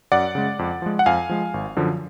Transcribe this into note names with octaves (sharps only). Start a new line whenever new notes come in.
F#2 D5 F#5
C#3 G#3
F2
F3 G#3
F#5
F2 F5 G#5
F3 G#3
G#1
F#2 D3 F3